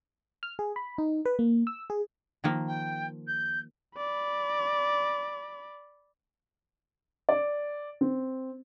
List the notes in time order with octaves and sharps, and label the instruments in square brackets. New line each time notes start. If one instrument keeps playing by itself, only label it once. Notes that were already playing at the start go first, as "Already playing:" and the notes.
[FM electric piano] F6
G#4
B5
D#4
B4
A#3
E6
G#4
[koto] D#3 F3 A#3
[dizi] G5
G6
[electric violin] D5 B5
[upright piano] D5
C4